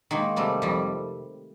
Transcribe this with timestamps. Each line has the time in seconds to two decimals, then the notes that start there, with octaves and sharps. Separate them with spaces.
0.11 D#3 G#3 A#3
0.36 C3 G3 A3
0.62 F2 G3